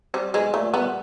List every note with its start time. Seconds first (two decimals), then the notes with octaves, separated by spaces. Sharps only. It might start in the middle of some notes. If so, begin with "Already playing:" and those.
0.14 G3 C4
0.34 B1 G#3
0.54 A#2 A3
0.74 G3 B3